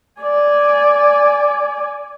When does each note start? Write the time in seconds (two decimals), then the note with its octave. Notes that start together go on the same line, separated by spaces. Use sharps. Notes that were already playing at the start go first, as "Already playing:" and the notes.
0.22 D5 G#5